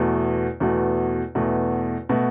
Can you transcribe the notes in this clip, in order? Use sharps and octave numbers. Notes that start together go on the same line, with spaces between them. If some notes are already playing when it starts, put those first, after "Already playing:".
Already playing: E2 B2 A3 F#4
E2 B2 A3 F#4
E2 B2 A3 F#4
B2 A3 F#4